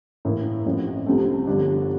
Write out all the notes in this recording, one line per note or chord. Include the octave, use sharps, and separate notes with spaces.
A2 E3 A#3 E4
A1 A2 F3 C4
C2 C3 F3 A3 C4
G1 G2 D3 G3 D4